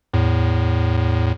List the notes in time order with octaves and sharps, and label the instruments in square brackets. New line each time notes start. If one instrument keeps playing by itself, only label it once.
[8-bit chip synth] E2 A2